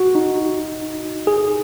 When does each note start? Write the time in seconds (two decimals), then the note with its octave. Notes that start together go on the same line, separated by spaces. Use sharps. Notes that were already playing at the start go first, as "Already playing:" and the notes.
Already playing: F#4
0.15 D#4
1.27 G#4